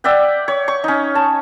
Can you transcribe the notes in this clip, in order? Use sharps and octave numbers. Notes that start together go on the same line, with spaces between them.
D5 E5 F#5 G5
C#5
C#6
C#4 D#4
A5